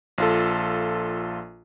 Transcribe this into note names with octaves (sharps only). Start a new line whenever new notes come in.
A#1 F4 A4